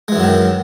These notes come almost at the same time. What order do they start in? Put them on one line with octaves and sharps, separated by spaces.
G#3 E3 F#2 F#3 D#3